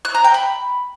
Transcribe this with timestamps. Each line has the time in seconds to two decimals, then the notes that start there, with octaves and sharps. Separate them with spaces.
0.05 F#6
0.15 A#5
0.24 G5
0.34 B5